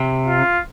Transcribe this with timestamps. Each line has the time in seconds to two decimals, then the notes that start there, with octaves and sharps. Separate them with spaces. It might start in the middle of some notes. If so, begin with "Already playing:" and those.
Already playing: C3
0.27 F4